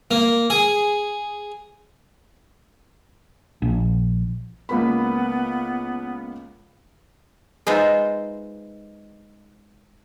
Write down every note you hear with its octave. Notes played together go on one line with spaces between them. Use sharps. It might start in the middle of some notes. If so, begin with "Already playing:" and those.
A#3
G#4
A#1
C#2 A#3 B3 B5
G#3 B3 D#4 F4 C5 E5